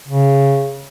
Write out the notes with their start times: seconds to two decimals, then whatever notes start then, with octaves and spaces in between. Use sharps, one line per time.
0.08 C#3